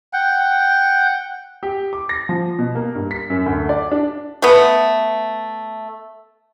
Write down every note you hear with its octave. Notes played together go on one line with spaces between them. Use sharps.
F#5 G5
G4
D6
A#6
F3
B2
A#3
G2
B6
F#2
D2
D5
D4
A3 B3